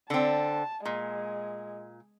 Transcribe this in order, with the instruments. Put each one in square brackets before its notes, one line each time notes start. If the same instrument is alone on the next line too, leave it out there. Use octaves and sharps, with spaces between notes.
[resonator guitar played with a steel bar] D3 C4 [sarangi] A5
[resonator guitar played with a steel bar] A#2 [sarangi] G#3